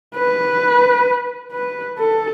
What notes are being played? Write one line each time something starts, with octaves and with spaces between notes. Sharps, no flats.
B4
B4
A4